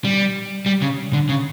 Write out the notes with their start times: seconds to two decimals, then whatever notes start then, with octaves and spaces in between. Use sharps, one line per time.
0.05 G3
0.66 G3
0.82 C#3
1.13 D3
1.29 C#3